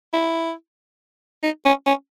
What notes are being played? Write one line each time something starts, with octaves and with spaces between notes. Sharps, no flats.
E4
D#4
C#4
C#4